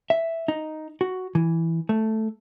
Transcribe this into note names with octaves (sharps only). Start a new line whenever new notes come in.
E5
D#4
F#4
E3
A3